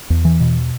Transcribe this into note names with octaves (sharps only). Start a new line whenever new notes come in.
E2
E3
B2